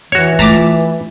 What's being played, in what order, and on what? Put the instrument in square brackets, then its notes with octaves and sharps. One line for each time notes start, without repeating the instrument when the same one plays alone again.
[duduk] E3 [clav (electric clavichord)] F#4 C#5
[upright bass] A3 F4 [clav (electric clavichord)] A5 A#5 [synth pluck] D6 B6